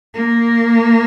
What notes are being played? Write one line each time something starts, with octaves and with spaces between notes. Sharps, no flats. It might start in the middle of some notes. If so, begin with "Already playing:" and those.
A#3